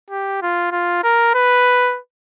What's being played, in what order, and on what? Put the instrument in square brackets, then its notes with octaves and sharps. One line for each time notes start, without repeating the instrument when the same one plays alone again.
[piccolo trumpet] G4
F4
F4
A#4
B4